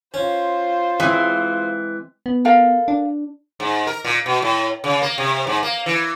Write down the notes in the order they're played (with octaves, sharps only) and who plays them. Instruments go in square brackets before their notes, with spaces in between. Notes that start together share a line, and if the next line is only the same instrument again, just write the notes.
[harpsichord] C#4 [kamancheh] F4 C5
[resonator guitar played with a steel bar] E3 [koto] G#3 C4
[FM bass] B3
[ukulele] A4 A#4 F5
[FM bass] D4
[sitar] G#2
A#4
A#2
B2
A2
C#3
A#3
C3
G#2
A#3
E3